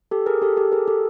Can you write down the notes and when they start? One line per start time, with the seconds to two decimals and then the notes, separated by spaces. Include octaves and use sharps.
0.11 G4 A4
0.26 G#4 A#4
0.42 G4 A4
0.57 G4 A4
0.72 G#4 A#4
0.88 G4 A4